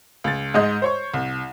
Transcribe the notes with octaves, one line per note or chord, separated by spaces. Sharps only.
C#2 A6
G#2 G#3 D#5 G6
C5 C#5 C#6
C2